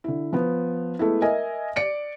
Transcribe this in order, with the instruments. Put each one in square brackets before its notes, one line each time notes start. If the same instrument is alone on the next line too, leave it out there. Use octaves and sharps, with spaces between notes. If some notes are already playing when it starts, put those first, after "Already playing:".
[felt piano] D3 E4
F3 B3
G#3 A3 B3 E4
A#4 D#5 E5 G#5
D5 C#7 D7